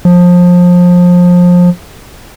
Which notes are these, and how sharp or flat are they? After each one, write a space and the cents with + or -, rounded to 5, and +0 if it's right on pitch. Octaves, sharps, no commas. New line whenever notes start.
F3 +25